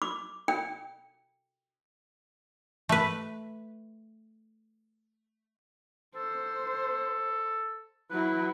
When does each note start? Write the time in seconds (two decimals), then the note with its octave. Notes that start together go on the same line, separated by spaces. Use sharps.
0.02 D6
0.48 G5
2.89 A3 B4
6.16 A4 C5
8.11 F#3 E4 B4